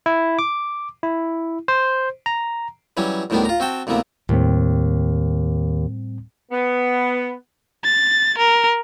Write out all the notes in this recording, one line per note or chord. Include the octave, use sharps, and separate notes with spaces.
E4
D6
E4
C5
A#5
E3 F#3 G3 C#4
D2 A2 D#3 G3 B3 D4
F4 A#5
C4 F#4 G5 A5
D2 C3 E3 A#3 B3
D#2 A2 G3 C4
B3
A6
A#4